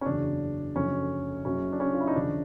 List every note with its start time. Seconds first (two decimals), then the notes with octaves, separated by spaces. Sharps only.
0.01 C#4
0.05 F#1 E2 C#3 F#3 D4
0.75 F#1 F2 D3 F#3 C#4
1.45 F#1 F#2 C#3 F#3 C#4
1.72 D4
1.80 C#4
1.93 F4
2.00 E4
2.07 D#4
2.15 D#2 C#3 F3 D4